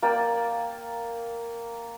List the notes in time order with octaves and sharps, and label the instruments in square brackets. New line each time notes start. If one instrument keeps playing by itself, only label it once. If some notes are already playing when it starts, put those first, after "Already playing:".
[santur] A#3 D5 G5